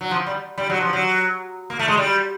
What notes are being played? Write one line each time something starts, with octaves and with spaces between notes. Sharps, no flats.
F#3
F3
G3
G3
F#3
F3
F#3
A#3
A3
G#3
G3